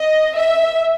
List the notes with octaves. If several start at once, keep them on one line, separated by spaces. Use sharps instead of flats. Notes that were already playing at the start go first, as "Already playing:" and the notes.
Already playing: D#5
E5